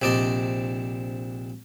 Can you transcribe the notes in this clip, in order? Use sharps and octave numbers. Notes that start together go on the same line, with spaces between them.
A#1 C3 D4 D5 D#5 C6